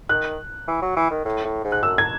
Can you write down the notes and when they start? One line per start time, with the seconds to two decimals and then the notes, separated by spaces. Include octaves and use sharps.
0.09 D#3 F#6
0.68 E3
0.82 F#3
0.97 E3
1.11 D#3
1.25 A2
1.45 A2
1.65 G#2
1.72 F#6
1.83 F#2 E6
1.98 G#6